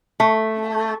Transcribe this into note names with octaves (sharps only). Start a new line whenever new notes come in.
A3